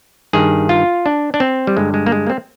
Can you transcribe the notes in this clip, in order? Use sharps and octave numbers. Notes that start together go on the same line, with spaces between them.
G2 D#3 G#4
F4
D4
D4
C4
G3
G2 D3 G#3
G#3
A#3
G#3
A#3
C4